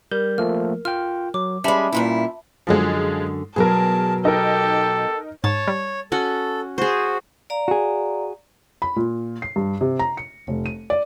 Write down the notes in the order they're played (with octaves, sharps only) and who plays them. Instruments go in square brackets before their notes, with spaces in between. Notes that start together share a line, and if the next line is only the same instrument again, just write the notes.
[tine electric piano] G3 G6 [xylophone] A#4
[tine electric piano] F3 A3 A#3 [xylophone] F6
[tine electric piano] F4 G5 [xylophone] F6
[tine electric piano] F#3 [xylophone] D6
[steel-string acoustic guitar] G3 G#3 [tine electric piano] C#4 [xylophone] E5 A5 B5
[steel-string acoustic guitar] G2 A#2 E4
[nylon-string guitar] F#2 D3 F#4 [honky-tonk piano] F3 G#3
[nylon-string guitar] B2 F#3 [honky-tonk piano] G#4 A#4 [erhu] A5
[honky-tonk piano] D#4 A#4 [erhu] G4 [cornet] A4
[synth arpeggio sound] G#2 [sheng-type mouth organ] C#5 [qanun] A5
[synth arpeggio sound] G3
[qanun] C#4 F#4 [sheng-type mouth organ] A4
[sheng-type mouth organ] F#4 [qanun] G#4 C5
[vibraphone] D5 F5 A#5
[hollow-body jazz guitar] F#4 G#4
[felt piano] B5
A#2
C7
G2
C3
A#5
C#7
F1
D#7
D5